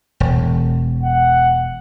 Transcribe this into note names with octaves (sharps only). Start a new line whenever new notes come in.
E1
F#5